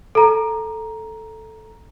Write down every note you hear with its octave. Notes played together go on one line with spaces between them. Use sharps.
A4 A#5